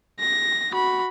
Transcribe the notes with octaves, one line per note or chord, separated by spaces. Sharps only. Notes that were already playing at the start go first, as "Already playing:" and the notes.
A#6
F#4 B5